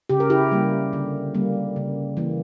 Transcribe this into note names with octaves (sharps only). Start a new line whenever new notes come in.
C#3 G4
A#4
E4 G4
G3 A#3
D3
G3 A#3
C#3
E3 A#3